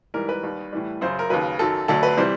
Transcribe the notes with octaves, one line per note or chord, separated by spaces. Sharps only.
G#2 E3 G3 A#4
B4
D#2 D#3 G3
A2 E3 G3
F#2 C#3 F#3 C5
A#4
D#2 C#3 F#3 B4
F#2 D#3 F#3 A4
D2 D3 F#3 A4
B4
C3 E3 G3 C5